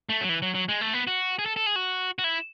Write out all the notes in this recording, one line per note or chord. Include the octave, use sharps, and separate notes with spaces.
A3
F#3
E3
F#3
F#3
G#3
A3
B3
F#4
G#4
A4
A4
G#4
F#4
F#4
E4